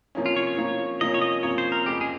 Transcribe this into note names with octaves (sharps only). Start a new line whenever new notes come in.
C3 F3 A#3 C#4
F4
C#5
C#5
C3 F3 A#3 C#4
C3 F3 A#3 C#4 D#5
C#5
D#5
C3 F3 A#3 C#4 C#5
C5
A#4
F2 C#3 G#3 G4
G#4